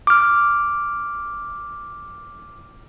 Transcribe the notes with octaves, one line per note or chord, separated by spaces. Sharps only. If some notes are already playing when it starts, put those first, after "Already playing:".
D6 F6